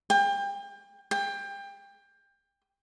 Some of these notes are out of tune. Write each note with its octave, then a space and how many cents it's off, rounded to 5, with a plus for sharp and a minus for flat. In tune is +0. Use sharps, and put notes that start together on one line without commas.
G5 +30
G5 +25